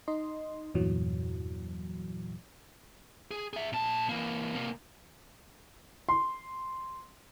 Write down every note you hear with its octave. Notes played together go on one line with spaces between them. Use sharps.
D#4 D#5 C6
E2 G2 A#2 E3 F#3
G#4
G#4 E5
A#2 A5
E3 A#3
C3 A#3
C6